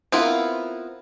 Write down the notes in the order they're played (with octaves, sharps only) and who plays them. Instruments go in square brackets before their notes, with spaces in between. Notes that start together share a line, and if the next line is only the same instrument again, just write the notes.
[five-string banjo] B3 C4 E4 F4 A#4